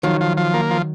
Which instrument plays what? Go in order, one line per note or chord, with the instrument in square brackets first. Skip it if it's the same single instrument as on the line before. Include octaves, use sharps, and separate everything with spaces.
[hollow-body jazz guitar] D#3 F#3 [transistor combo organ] F3
[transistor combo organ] F3
F3
A#3
F3